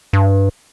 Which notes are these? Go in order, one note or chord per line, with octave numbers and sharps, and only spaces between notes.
G2